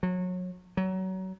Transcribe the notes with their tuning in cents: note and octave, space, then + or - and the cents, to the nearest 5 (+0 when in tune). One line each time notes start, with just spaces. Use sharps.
F#3 -25
F#3 +25